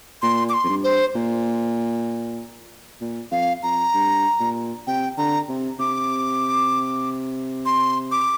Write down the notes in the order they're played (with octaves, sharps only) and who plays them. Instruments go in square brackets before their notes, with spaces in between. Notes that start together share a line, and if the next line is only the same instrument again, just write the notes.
[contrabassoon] A#2 [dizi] C6
[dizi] D6
C6
[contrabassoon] F2
G2
[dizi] C5
[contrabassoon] A#2
A#2
[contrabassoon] F2 [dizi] F5
[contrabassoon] F2 [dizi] A#5
[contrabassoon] G2
A#2
[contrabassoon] C3 [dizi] G5
[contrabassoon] D3 [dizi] A#5
[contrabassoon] C3
[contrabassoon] C3 [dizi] D6
[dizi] C6
D6